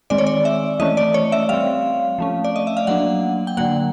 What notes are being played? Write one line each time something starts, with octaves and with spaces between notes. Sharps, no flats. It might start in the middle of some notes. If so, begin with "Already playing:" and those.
D#3 G#3 C4 D5
C#5
D5
E5
E3 A3 C#4 D#5
D5
C#5
E5
G3 C4 F5
F3 A3 C#4
D5
D#5
E5
F5
F#3 A#3 D4 F#5
G5
D3 F#3 A#3 F#5